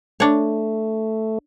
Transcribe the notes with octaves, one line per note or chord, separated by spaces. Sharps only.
A3 D4 C#5